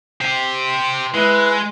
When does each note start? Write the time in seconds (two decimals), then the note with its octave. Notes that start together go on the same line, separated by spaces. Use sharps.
0.21 G4 C5
1.14 G#3 E4 B4